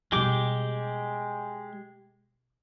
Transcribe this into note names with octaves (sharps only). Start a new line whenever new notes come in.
B2 G3 G#3 G4 D6